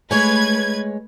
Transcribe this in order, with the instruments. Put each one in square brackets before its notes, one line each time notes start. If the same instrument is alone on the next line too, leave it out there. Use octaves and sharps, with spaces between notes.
[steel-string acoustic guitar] G#3 C#5 G#5 [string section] A3 B4 G#6